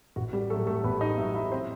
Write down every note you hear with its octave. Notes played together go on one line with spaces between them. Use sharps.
A1 F#4
G3 G4
A2 F#3 A3 A4
A3 A4
A1 B3 B4
D#4 D#5
A2 F#3 E4 E5
E4 E5
C4 C5